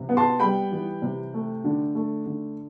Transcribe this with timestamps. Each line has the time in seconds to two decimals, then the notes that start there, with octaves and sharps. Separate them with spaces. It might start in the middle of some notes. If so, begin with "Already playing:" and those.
Already playing: C3 E3
0.09 B3
0.17 A5 C6
0.40 G3 G5 B5
0.72 E3
1.02 C3
1.34 A3
1.64 D3
1.95 A3
2.26 D3